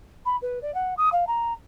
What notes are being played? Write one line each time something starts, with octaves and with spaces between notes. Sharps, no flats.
B5
B4
D5
F#5
D#6
F5
A#5